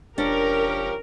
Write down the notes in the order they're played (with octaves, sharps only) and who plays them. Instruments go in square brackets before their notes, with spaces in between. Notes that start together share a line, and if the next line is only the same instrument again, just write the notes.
[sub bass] E1 [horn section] F3 C#4 G4 [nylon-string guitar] D4 [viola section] A#4